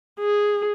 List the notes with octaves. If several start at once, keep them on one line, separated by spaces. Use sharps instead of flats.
G#4